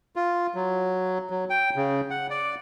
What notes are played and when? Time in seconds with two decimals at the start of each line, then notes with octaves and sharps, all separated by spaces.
0.16 F4
0.55 F#3
1.30 F#3
1.50 G5
1.76 C#3
2.10 F#5
2.30 D5